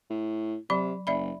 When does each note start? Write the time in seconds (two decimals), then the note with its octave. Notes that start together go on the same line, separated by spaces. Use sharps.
0.10 A2
0.70 C3 F#3 D5 B5
1.07 F#1 D5 E5 B5